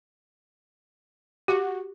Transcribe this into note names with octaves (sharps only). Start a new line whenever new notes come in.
F#4 G4